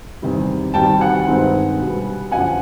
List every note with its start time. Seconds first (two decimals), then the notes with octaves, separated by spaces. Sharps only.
0.22 E2 C3 D#3 G3
0.74 D2 C3 D#3 G3 G5 A5
1.01 F#5 G#5
1.27 G2 D#3 G#3 C4 D#4
1.80 B2 G3 B3
2.31 F#2 D3 F3 F#5 G#5